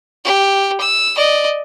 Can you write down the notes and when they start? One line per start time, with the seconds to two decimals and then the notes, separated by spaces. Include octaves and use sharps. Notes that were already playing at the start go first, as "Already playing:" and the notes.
0.25 G4
0.80 E6
1.16 D5 D#5